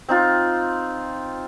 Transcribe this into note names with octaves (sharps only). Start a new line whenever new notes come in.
C4 D#4 F4